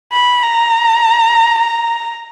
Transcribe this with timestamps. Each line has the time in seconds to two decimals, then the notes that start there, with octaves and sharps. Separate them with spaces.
0.13 B5
0.43 A#5
1.59 A#5